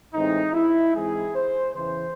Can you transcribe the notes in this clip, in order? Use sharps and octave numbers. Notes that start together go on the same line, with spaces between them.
A2 E3 G#3 C4 D#4
E4
G#2 E3 G#3 C4 G#4
C5
E2 C#3 E3 C5